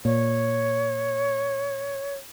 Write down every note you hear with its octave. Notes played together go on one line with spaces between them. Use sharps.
A#2 C#5